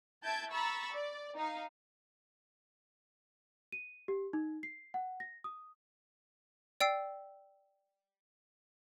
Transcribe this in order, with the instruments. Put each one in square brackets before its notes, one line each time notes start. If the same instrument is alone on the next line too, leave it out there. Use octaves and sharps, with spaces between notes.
[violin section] E4 E5 A5 G6 G#6 D7
A#5 B5 C#6 E6 A6
D5
D#4 F5
[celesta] D#7
G4
D#4
C7
F#5
A#6
D#6
[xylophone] D5 G5 E6 C7